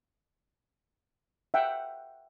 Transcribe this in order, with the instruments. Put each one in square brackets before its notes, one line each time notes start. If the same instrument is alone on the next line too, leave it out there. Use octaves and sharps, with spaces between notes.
[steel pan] E5 F#5 G5